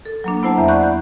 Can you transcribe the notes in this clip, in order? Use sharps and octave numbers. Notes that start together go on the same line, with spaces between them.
A4
F#3 A#3 D4
B3 E4 C5 F#5 A5
E2 E5 A#5
D5 F#5 B5 C#6 F#6 G6
G6